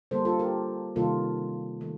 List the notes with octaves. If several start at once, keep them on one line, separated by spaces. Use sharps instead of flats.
D3 G3 A#3 A4 C5
F4 A4
G4 A#4
C3 D#3 G3 A#3 F4 A4
D#3 A3